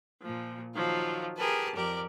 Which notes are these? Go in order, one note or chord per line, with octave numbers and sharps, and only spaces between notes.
A#2 F3
D#3 F3 F#3 F4
G4 G#4 A#4 B4 A5
F2 G4 A#4 D5